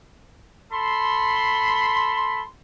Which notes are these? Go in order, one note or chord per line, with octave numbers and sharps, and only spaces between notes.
A4 B5 C6